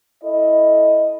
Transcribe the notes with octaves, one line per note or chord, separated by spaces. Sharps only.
E4 A4 D#5